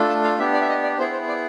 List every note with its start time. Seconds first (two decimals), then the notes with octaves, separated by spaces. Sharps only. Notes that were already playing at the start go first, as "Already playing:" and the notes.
Already playing: A3 D4 F4 A4
0.09 A5
0.24 F5
0.39 B3 D4 G4 E5
0.53 D5
0.62 E5
0.69 D#5
0.83 D5
0.98 B3 E4 G#4 C5
1.13 C5
1.28 D5